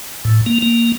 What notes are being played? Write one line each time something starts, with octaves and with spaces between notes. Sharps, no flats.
A2
A#3
A#3